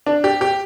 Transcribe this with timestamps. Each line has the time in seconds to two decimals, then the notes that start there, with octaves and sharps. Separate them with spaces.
0.06 D4
0.24 G4
0.41 G4